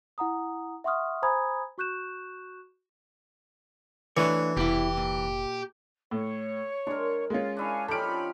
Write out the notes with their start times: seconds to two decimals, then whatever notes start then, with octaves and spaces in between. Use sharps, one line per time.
0.18 E4 F#5 A#5 D#6
0.84 E5 F#5 C6 C#6 D#6 F6
1.23 C5 G#5 A#5 B5 D#6 G#6
1.78 F#4 C#6 F#6 G6 E7
4.17 E3 A3 D4 C#5
4.57 F1 B2 E4 G4
4.97 A#2
6.11 A2 C#5
6.87 G#3 D4 A#4
7.30 G#3 C#4 F4
7.57 D4 E4 C#5 F5 G#5 C#6
7.88 F3 C#4 D#4 G4 A4 B5 F6 D7